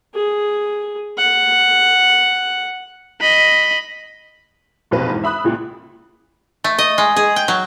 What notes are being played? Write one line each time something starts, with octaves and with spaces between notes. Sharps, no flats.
G#4
F#5
D#5 B5
F1 B1 B2 C4 B4
E2 G#2
E5 B5 D#6 F#6
C#2 A#2
A3
D#5
G#3
G#4
G5
F#3